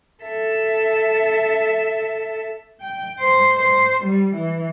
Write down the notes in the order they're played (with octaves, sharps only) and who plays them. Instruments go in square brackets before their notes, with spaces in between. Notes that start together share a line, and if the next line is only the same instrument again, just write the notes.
[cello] A4 E5
G5
C5
C5
G3
E3